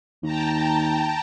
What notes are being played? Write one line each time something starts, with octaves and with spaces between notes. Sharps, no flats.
D#2 G5 A5 A#5